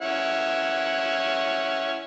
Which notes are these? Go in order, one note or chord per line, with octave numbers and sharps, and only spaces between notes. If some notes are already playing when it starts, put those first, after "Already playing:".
C#4 E4 F#5